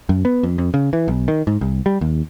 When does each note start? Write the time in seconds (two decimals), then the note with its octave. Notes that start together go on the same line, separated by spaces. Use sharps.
0.09 F#2
0.25 B3
0.43 F2
0.58 F2
0.74 C#3
0.93 E3
1.08 B1
1.28 D#3
1.47 G#2
1.61 C2
1.86 G3
2.01 D#2